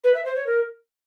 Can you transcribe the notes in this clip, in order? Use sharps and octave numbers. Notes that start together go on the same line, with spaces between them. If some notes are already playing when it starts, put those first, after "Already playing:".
B4
E5
C5
C#5
A#4